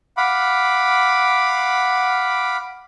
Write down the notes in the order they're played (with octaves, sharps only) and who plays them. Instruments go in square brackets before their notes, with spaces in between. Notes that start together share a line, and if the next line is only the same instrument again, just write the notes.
[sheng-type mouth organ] F5 F#5 B5 D6